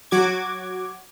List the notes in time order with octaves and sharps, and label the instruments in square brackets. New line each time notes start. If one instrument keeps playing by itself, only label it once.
[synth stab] F#3 F#4 D6 G#6